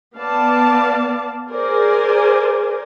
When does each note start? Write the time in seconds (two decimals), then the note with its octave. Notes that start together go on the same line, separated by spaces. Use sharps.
0.16 B3 D5 F5 A5
1.49 G#4 A#4 C5 D5 G#5